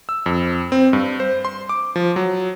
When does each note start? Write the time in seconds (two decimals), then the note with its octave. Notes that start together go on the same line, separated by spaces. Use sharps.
0.09 E6
0.26 F2
0.72 C4
0.93 G2
1.20 C5
1.45 C6
1.69 D6
1.96 F3
2.16 F#3